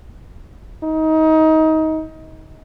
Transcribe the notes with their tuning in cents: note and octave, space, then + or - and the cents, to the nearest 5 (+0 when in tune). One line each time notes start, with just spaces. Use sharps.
D#4 +25